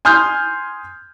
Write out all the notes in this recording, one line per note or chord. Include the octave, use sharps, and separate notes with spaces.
G#5 C6 D#6 F6 G6